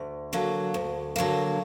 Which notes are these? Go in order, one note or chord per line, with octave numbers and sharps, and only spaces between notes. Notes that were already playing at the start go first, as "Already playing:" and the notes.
Already playing: D2
D3 F#3 A#3
D2
D3 F#3 A#3